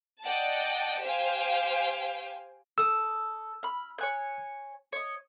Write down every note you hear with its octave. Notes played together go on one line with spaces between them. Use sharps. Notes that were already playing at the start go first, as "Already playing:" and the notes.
D5 D#5 F#5 G5 A5
G4 C5 F5 G5 G#5
A4 D#6 E6
B5 F6
C#5 G#5 F#6
C#5 D#5